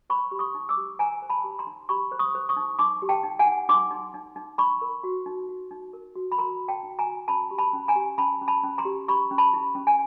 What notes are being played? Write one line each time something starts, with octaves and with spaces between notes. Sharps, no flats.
C5 B5 C#6
G4
C#6 D#6
D#4
D6 E6
G4
C5 G#5 A#5
C5
A5 B5
G4
A#5 C6
D#4
G4 B5 C#6
C5
C#6 D#6
C5
C#6 D#6
D#4
D#4 C6 D6
G4
G5 A5
D#4
F#5 G#5
D#4
D#4 C6 D6
D#4
D#4
D#4
D#4 B5 C#6
A#4
F#4
D#4
F#4
D#4
A#4
F#4
B5
A#4 A#5 C6
F#4
G5 A5
D#4
G#5 A#5
F#4
C#4 A5 B5
G4
A5 B5
C#4
G#5 A#5
G4
C#4 A5 B5
C#4
A5 B5
C#4
A#5 C6
G4
G4 B5 C#6
C#4
A5 B5
E4
C#4
G#5